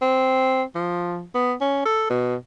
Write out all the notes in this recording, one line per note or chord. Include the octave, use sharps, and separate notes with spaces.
C4
F3
B3
C#4
A4
B2